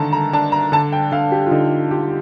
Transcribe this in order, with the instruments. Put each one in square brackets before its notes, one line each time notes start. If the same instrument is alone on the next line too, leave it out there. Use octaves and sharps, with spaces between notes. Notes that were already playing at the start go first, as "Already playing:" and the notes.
Already playing: [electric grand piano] D3 D#3 [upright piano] A5 A#5
[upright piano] A#5
[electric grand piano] D4 [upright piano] A5
[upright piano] A#5
[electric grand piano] D3 [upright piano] A5
[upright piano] G5
[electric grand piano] D3 [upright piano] F5
[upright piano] G4
F4
[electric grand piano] D3 [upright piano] D#4
[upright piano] F4 [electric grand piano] G4